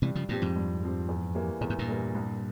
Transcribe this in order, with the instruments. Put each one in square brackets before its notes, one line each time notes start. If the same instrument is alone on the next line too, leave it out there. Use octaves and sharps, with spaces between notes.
[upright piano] G2 [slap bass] C3 E3
[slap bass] C#3 F3
[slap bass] G2 A#2 [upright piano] F3 C4 G4
[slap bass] F2 G#2
[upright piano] G2
F3 C4 G4
E2
E3 G3 A#3
[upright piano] E2 [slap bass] A#2
[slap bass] G#2
G2 A#2
[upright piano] E3 G3 A#3
C2